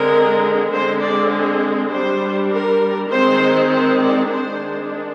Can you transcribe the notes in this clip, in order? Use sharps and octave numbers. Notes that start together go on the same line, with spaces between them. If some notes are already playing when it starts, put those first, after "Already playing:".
Already playing: D3 G#3 C4 A#4
D3 G#3 C4 C5
D5
G#4
G3 D4 C5
A#4
D#3 G#3 C4 C5
C5
D5
D#3 G#3 D4 C5